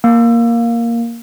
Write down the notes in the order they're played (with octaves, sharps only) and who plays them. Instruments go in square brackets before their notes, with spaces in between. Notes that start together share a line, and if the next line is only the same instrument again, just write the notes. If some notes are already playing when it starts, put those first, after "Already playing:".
[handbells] A#3